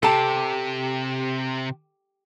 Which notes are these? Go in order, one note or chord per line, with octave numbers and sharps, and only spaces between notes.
C3 G4 A4 A5